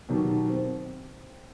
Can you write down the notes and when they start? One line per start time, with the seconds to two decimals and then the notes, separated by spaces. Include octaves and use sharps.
0.09 B2 D#3 F#3 G4
0.50 C4